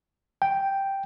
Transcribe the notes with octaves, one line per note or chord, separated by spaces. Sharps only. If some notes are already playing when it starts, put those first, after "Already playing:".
G5